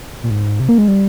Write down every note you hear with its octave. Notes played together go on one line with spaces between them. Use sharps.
A#2
G#2
C3
A#3
G#3
G3